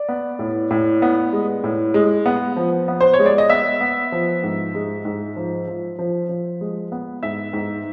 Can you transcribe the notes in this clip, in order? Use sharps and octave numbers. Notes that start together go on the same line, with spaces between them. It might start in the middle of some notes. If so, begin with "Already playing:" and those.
Already playing: D5
B3
A2
A2
B3
G#3
A2
G#3
B3
F3
B3
C5
C#5
G#3
D5
D#5
B3 E5
B3
F3
G#2
G#3
G#2
F3
F3
F3
F3
G#3
B3
G#2 E5
G#2